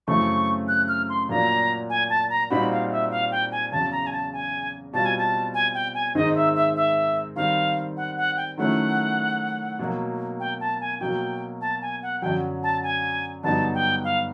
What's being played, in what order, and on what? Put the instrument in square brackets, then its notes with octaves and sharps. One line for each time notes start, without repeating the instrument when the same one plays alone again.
[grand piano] F#2 C#3 E3 A3 C4 [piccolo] C#6
[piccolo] F#6
F6
C6
[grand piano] A#2 F#3 A#3 D4 F4 [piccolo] A#5
[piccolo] G#5
A5
A#5
[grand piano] A#2 G3 C4 D#4 F#4 [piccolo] B5
[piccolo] F5
E5
F5
G5
G#5
[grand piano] E2 C#3 F#3 [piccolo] A5
[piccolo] A#5
G#5
A5
G#5
[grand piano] B2 G3 C4 F4 [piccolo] A5
[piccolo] G#5
A5
G#5
G5
G#5
[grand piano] G#2 D#3 G#3 C4 D#4 [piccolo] D#5
[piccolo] E5
E5
E5
[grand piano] D#3 G3 C4 [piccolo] F5
[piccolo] F#5
F#5
G5
[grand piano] D#3 F#3 A3 C#4 E4 [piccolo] F#5
[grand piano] B2 F#3 A#3
[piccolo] G5
A5
G#5
[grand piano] B2 F#3 A#3 [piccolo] G5
[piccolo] A5
G#5
F#5
[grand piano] F#2 D3 F#3 [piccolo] G5
[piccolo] A5
G#5
[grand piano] G2 D3 F#3 B3 D#4 [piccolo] A5
[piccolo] G5
F5